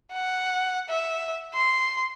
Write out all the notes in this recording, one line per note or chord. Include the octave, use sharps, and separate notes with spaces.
F#5
E5
C6